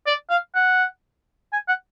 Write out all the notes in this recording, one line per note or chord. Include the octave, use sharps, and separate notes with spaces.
D5
F5
F#5
G#5
F#5